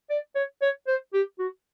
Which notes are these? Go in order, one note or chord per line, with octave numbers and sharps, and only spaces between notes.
D5
C#5
C#5
C5
G4
F#4